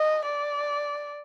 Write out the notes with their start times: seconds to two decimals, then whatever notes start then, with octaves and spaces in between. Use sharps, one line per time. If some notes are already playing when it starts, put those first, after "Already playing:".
Already playing: D#5
0.26 D5